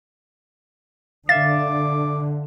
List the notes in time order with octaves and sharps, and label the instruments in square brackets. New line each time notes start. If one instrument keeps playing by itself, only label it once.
[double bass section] D3 [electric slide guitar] E5 F5 [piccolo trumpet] D6 [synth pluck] A6